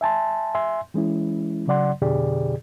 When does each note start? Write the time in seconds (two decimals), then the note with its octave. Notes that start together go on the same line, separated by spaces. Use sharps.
0.01 E5 G#5 A5 C6
0.55 E5 G#5 C6
0.94 E3 G#3 C#4 E4
1.68 C#3 F#3 D5 F#5 C6
2.02 F2 B2 D3 G4 G#4 D5